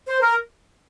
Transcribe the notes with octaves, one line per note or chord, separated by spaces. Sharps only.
C5
A#4